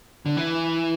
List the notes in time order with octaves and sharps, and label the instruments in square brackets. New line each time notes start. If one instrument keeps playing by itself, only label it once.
[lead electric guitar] D3
E3